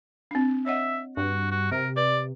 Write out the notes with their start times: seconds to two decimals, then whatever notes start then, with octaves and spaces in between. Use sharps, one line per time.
0.31 C4 D4
0.66 C#5 D#5 E5 F#5
1.17 G2 F#4
1.51 F#4
1.71 C3 A#4
1.97 B4 D5